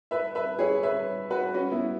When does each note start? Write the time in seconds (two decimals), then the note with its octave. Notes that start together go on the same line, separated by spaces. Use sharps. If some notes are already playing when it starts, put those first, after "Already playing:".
0.11 B4 E5
0.35 B4 E5
0.59 G#4 C#5
0.83 B4 E5
1.30 F#4 B4
1.54 C#4 F#4
1.72 B3 E4